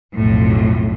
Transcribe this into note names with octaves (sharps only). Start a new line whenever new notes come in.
B1 F2 A2